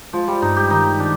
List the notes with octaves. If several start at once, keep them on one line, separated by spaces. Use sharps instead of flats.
F3 G#3
G3
G2 D#4
G4
D#3 D#4
D4